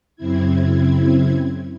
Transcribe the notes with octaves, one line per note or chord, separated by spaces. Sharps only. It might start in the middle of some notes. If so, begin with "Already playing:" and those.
F#2 C#3 C4 E4 G#6